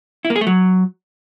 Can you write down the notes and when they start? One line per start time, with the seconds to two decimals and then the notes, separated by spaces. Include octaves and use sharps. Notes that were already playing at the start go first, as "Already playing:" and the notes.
0.25 E4
0.30 A#3
0.36 G#4
0.41 A3
0.47 F#3